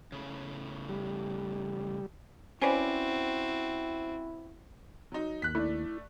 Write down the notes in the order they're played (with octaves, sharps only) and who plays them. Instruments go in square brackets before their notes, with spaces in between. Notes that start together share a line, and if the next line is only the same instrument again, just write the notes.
[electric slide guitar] A2 C#3
[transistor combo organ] G3
[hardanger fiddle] C4 F#4 [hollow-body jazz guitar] C#4 B4 D5 [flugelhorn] E4 [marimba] C5 G#5
[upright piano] F#3 D#4
[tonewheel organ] D#2 [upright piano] F#6 B6
[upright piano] A3 D4 [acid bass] E4